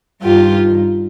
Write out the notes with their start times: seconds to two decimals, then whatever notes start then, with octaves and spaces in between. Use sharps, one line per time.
0.21 G2 D#3 F4 G4